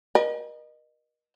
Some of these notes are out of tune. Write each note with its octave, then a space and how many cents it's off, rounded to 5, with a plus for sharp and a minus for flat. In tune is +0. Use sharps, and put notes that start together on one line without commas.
A#4 +40 D#5 -25